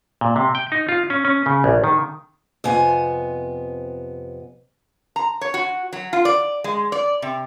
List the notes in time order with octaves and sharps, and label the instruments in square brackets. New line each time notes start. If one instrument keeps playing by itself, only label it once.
[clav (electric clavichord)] A#2
C3
G5
D#4
F4
C#4
C#4
C#3
A#1
D#3
[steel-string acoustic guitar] F2 C3 B3 G#5
[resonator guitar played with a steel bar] A#5
C#5
F#4
F#3
F4
D5
G#3
D5
C3